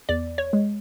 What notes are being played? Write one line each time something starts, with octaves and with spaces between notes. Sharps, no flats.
E2 D5
C#5
G#3